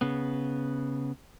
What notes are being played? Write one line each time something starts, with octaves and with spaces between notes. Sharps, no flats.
C#3 B3